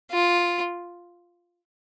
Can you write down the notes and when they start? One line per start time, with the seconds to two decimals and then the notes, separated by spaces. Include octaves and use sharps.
0.11 F4